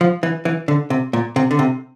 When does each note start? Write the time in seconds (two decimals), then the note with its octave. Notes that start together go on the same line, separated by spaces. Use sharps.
0.01 F3
0.23 E3
0.45 E3
0.68 D3
0.90 C3
1.13 A#2
1.36 C3
1.51 D3
1.59 C3